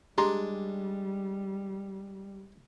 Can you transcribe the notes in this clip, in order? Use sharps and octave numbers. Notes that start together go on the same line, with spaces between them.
G3 G#3 D4 G4 A#5 C6